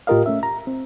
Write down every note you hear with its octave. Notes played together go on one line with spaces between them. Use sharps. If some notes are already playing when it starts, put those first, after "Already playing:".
A2 F4 G4 A#4 D#5 F5
A3 C#4 E5
A#5
C4